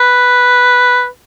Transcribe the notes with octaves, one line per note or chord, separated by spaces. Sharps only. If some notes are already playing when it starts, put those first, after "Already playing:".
Already playing: B4